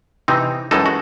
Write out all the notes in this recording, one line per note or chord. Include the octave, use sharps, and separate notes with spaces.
C3 E3 C4 D#4
F#2 E3 G#3 D#4 A4
F#4